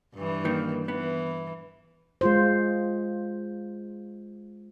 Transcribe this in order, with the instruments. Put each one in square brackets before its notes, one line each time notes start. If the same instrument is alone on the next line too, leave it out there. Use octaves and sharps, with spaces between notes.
[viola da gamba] G2 E3
[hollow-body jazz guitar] D#3 A#3
[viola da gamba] E3 [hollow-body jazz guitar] B3
[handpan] G#3 F4 C5